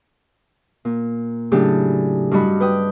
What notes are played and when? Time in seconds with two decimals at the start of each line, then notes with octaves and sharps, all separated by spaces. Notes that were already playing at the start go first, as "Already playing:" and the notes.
0.85 A#2
1.52 A2 C#3 F#3 D4 G4
2.31 G2 G3 F#4 D#5 B5
2.60 B4 G5 D#6